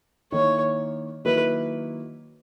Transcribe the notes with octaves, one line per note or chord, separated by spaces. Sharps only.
D#3 A#3 E4 C#5
D#3 F#3 A#3 E4 B4